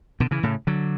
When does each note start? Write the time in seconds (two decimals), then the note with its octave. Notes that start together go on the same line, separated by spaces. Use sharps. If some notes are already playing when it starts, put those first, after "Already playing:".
0.20 B2 D3
0.31 C#3 E3
0.43 A2 C#3
0.67 D3 F#3